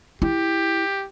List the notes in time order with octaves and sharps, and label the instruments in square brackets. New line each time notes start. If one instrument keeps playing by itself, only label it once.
[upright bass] E4 [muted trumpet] G4